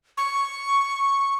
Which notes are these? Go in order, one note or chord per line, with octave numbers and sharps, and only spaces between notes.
C#6